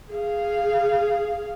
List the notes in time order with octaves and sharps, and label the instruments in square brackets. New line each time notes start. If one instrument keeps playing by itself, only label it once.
[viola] G#4 F5